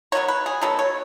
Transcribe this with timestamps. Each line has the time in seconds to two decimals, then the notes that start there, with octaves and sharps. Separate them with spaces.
0.12 D#3 F#3 B3 C#5
0.28 B4
0.46 G#4
0.61 D#3 F#3 B3 A4
0.79 C#5